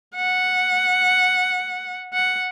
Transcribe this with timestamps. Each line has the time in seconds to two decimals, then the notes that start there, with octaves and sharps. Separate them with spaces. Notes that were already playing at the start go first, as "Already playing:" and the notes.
0.16 F#5
2.14 F#5